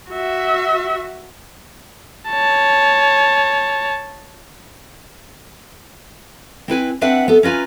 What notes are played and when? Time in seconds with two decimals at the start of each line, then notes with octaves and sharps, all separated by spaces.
0.10 F#4 E5
2.30 C#5 A5
6.68 C4 E4 B4 G#5
7.01 C4 D4 B4 E5 F#5
7.28 B3 A4
7.43 C#4 F4 B4 G#5 A#5